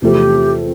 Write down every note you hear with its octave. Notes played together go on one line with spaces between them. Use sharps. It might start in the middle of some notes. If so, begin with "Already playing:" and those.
E2 C3 F3 A3 C4 G4